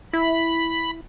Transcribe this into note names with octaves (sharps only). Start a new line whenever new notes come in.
E4 B5